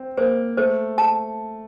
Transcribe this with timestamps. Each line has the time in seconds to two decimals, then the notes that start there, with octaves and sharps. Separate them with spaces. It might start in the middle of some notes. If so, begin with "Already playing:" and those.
Already playing: C4
0.17 A#3 C5
0.58 A3 C5
0.98 A5